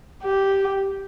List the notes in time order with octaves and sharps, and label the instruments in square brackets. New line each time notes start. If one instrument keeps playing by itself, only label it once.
[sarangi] G4